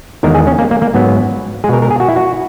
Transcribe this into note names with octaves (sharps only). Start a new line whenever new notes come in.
E2 D#3 G#3 A#4
G#4
C#4
A#3
A#3
A#3
G#2 F#3 B3
B2 G#3 G#4 A#4
A#4
G#4
F#4
E4
F#4